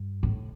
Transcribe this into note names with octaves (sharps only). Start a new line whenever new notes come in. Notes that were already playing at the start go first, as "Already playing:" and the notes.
Already playing: G2
A2